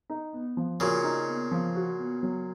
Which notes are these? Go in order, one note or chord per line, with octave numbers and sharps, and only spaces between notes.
D#4
B3
F3
A#2 C#3 F#4
D#4
B3
F3
F#4
B3
F#3